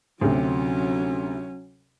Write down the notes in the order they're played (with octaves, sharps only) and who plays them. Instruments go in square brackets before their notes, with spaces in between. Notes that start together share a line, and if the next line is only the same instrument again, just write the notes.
[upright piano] D2 C3 [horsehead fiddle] F#3 C#4